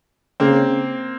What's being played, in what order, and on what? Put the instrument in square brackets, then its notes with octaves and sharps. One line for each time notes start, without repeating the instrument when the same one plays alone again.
[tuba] C#3 [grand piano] A#3 C4